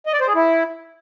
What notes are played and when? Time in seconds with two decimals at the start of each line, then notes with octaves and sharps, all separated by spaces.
0.06 D#5
0.13 D5
0.21 C5
0.28 G#4
0.35 E4